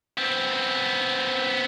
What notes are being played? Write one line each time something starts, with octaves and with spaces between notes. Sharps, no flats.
B3 C4